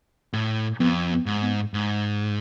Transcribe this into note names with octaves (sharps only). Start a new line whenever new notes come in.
A2
F2 B3
B3
G#2
B3
G#2